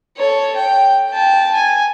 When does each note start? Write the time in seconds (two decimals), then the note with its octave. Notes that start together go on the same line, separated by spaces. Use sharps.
0.17 A4 C#5
0.56 G5
1.09 G5 A5
1.54 G#5